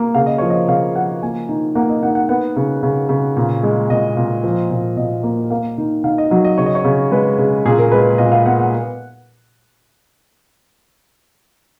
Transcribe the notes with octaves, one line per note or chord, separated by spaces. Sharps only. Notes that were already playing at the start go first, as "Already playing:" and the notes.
Already playing: A#3
C#3 F5
D#5
F3 C#5
D#5
C#3 F5
F3 F#5
A#3 G#5
D#3
A#3 F#5
D#5
D#3 F#5
F#5
B3 F#5
C#3
C#3
C#3
A#2
G#3
A#2 D#5
A#2
F3
A#2
A#2 D#5
A#3
A#3 F5
D#3
D#3 F5
D#5
F#3 D#5
D#5
C#3 C#5
D#5
C#5
C#3
G#3 B4
C#3
A#2 G#4
A#4
G#3 B4
A#2 D#5
F5
B3 F#5
F#5